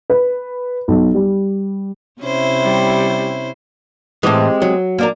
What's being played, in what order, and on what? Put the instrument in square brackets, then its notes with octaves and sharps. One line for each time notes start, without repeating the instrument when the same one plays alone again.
[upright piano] B4
B1
G3
[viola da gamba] C3 E4 [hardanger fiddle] C#4 C5
[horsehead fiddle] G3
[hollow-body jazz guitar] A2 E3 [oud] G#3 C4 G4
[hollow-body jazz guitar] F#3
[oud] A#3 D4 A#4